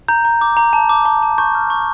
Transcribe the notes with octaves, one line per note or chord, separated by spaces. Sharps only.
A#5 G6
A#5
D6
A#5
A5
D6
A5
A5
C#6 G6
F6
C#6